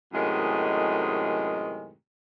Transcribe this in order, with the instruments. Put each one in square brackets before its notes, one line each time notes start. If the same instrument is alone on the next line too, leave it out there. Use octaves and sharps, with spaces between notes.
[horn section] F#2 A2 C3 D#3 G#3